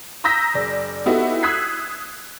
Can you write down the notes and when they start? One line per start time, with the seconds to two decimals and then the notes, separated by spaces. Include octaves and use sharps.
0.24 A#5 D#6 E6 G6 A#6 B6
0.54 F#1 D5
1.06 B3 D#4 E4 F#4 G4 A4
1.43 D#6 E6 F#6 G#6 B6 C7